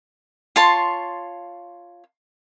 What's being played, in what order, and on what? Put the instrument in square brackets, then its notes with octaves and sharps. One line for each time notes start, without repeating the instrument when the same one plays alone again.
[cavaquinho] F4 C#5 A5 C6